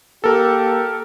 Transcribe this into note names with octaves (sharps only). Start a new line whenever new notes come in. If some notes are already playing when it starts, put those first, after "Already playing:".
A#3 G4 A4 A#4